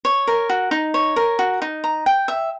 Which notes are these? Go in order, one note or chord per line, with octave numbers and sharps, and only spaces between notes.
C#5
A#4
F#4
D#4
C#5
A#4
F#4
D#4
A#5
G5
E5